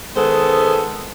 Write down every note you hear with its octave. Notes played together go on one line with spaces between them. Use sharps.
D#3 G#3 B3 A4 C5